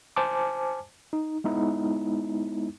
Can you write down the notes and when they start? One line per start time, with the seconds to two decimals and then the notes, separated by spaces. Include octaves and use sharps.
0.16 C5 G#5 A5 D6
1.13 D#4
1.44 G#3 B3 D#4 E4